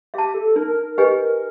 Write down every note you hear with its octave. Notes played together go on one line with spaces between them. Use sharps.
G4 E5 A5
A4
D#4 A#4
G4 B4 D#5 G#5